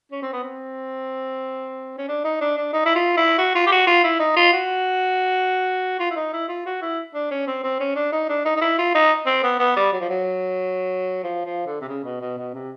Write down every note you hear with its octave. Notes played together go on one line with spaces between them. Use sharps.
C#4
C4
B3
C4
C#4
D4
D#4
D4
D4
D#4
E4
F4
E4
F#4
F4
G4
F#4
F4
E4
D#4
F4
F#4
F4
E4
D#4
E4
F4
F#4
E4
D4
C#4
C4
C4
C#4
D4
D#4
D4
D#4
D#4
E4
F4
D#4
C4
B3
B3
G3
F#3
F3
F#3
F3
F3
D3
C3
C#3
B2
B2
B2
C3